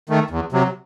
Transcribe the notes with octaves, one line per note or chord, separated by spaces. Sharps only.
D#3 A3
E2
C3 F#3